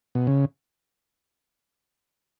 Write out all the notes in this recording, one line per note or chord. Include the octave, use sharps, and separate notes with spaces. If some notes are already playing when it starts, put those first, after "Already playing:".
B2
C#3